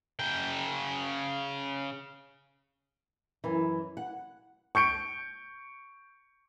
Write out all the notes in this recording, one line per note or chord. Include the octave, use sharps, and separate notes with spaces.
C#3 G5
F#2 E3
F#5
C#6 G6 C#7 D7